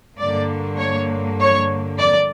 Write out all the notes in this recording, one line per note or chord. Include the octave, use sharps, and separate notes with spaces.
G2 D3 A#3 D5
C#5
C#5
D5